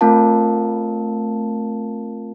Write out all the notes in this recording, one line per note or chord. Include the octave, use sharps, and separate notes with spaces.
A3 C4 F4 A#4 F5 A5